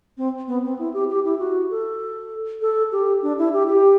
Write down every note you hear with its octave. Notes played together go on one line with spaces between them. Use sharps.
C4
B3
C4
E4
G4
G4
E4
F#4
A4
A4
G4
D4
E4
G4
G4